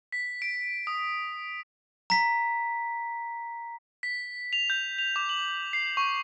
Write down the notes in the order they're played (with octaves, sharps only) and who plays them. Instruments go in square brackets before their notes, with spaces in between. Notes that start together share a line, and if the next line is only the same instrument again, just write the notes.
[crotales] B6
D7
D#6
[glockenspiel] A#5 B6
[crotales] B6
F7
G6
F7
D6
F#7
C7
C#6